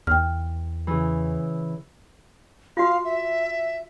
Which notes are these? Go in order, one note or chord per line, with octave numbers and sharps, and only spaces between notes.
E2 G5 F6
C#3 E3
F4 F#4 F5
E5